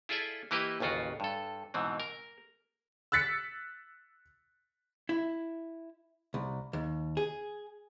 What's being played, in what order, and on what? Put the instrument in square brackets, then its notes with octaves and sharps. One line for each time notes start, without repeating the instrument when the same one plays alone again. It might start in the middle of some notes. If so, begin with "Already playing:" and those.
[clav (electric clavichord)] E4 F4 G#4 A4 D5 E5
E3 A#3 E4 G4 B4 D#5
A1 D#2 C#3 F4 F#4
G2 A4
G#2 B2 E3 C4
A#4
[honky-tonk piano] E6 F#6 A6 B6 C#7
[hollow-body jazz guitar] E4
C2
D#2
G#4